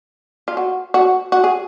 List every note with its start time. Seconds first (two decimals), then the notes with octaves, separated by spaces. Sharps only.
0.48 F4
0.57 F#4
0.94 F#4
1.32 F#4
1.44 G#4